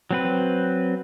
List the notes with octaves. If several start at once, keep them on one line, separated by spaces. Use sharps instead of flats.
F#3 C4 B4